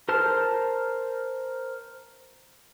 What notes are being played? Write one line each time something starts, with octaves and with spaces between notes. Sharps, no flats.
A#4 C5 A5 F6